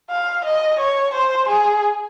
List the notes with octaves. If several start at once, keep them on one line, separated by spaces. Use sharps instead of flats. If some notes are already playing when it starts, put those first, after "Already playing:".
F5
D#5
C#5
C5
G#4